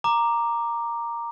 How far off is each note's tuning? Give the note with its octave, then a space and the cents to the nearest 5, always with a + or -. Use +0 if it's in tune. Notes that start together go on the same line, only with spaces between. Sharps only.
A#5 +0 D6 +10